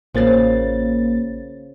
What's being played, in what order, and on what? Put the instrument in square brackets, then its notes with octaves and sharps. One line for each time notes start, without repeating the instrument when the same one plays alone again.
[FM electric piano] A1 A#3 A6 [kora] C#3 F3